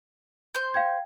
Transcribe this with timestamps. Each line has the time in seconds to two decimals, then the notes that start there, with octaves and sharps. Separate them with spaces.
0.54 C5 G6
0.74 F5 G5 G#6